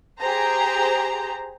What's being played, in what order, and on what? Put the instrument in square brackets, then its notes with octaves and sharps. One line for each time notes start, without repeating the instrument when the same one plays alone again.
[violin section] G4 G#4 C5 A#5